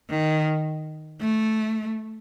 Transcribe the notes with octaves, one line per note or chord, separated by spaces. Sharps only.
D#3
A3